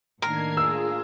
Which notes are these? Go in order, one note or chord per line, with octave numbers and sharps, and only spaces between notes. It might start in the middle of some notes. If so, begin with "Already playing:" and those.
A2 D#3 A#3 D4 A#4 G#6 C7
F4 G#4 E6